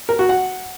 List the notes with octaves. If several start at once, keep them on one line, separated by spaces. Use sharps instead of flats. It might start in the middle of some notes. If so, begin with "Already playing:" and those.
A#4
F#4
F#5